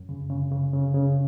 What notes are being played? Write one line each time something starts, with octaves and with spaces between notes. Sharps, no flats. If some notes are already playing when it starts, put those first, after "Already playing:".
Already playing: F#2
C#3
C#3
C#3
C#3
C#3